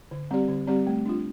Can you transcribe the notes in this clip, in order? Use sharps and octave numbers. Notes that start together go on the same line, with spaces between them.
D3
G3 C4 G4 D5
D3
G3 C4 G4 D5
A3
D4 F4